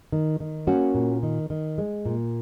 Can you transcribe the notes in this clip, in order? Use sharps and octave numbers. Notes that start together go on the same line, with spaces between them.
D#3
D#3
A#3 C#4 F#4
A#2
D#3
D#3
G#3
A#2